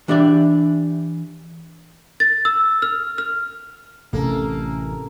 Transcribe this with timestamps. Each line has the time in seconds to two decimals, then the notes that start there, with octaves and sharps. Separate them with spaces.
0.08 E3 D4 G4 D5 E5
2.20 A6
2.45 E6
2.82 F6
3.18 F6
4.13 A1 C3 A3 A#3 C#4 A4